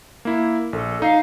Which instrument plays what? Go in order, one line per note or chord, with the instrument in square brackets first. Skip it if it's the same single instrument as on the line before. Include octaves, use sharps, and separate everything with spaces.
[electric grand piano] A#3 E4
[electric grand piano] A#1 [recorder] A4
[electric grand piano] D#4 [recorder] F5